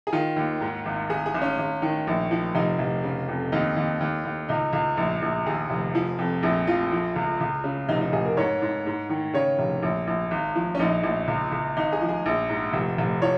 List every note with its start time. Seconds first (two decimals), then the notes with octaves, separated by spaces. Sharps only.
0.07 G#4
0.13 D#3 F4
0.36 D#2
0.61 G#2
0.86 G#1
1.10 G#1 G#4
1.26 G#4
1.35 G#1
1.42 C#4
1.58 G#1
1.82 D#3
2.07 A#1
2.31 F3
2.55 F1 D#4
2.79 F1
3.03 C#3
3.28 F2
3.52 D#2 D#4
3.76 D#2
4.00 D#2
4.25 D#2
4.49 C#2 D#4
4.73 C#2
4.97 A#1
5.22 A#1
5.46 D#2 G#4
5.70 F1
5.95 F3
6.19 F2
6.43 A#1 G#4
6.67 F3 F4
6.92 F3
7.16 C#2
7.41 C#2
7.64 C#3
7.89 F1 D#4
8.01 D#4
8.13 F1 G#4
8.26 A#4
8.37 G#2 C#5
8.62 G#2
8.86 G#2
9.10 D#3
9.34 C#3 C#5
9.59 F1
9.83 A#1
10.07 A#1
10.31 G#1
10.55 F3
10.75 C#4
10.80 A#1 D#4
11.03 A#1
11.28 C#2
11.52 C#2
11.77 G#1 D#4
11.93 G#4
12.01 F3
12.09 G#4
12.26 A#1
12.49 G#2
12.73 F1
12.98 F1
13.22 F3 C#5